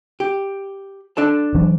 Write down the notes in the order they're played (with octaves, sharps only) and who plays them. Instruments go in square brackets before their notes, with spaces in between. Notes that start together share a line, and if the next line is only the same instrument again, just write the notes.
[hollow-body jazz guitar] G4
D4 A4 A5
[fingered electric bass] E3 F#3 C#4